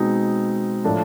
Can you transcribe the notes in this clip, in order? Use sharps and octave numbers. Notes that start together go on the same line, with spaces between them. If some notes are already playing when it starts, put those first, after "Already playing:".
Already playing: B2 G#3 C4 D#4
A2 F3 A3 D4